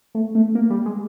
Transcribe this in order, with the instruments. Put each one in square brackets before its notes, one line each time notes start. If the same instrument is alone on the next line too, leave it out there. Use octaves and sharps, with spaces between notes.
[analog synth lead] A3
A3
A#3
G3
G#3